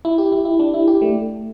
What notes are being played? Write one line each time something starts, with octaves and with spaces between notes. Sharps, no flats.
E4
G4
E4
E4
D4
E4
G4
A3